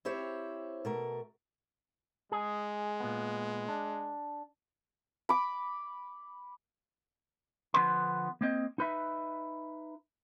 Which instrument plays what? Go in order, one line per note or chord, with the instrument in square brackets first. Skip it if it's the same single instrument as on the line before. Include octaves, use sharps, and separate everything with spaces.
[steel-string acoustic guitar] C4 E4 G4 C5 C#5
B2 A3 A#4
[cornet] G#3 [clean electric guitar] G#4
[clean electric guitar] A#2 B3
D4
[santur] B5 D6
[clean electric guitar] D3 F3 B3 D4 B4 C6
A#3 C4 D#5
D#4 B4 E5